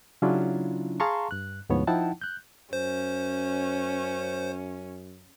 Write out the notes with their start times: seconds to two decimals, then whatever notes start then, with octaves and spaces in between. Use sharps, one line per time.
0.22 C#3 F#3 C#4 D4 E4 F4
1.00 G#4 F5 A5 A#5 C6 C#6
1.31 G2 F#6
1.69 D2 G#2 F3 B3 C#5
1.87 F3 D#4 E4 F#5 G5 A5
2.22 F#6 G6
2.73 F#2 C#4 C5